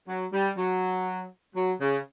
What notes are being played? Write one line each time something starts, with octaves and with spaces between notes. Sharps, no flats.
F#3
G3
F#3
F#3
C#3